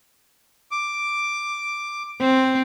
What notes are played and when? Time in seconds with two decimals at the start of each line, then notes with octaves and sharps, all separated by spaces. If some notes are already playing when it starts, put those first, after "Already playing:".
0.71 D6
2.20 C4